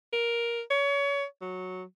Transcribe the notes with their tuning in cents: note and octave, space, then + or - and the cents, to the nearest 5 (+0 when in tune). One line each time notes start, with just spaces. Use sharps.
A#4 +10
C#5 +30
F#3 -5